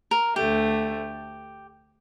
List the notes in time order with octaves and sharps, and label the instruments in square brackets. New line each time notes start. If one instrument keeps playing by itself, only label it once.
[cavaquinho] A#4
[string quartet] D2 D3 A3 [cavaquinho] G4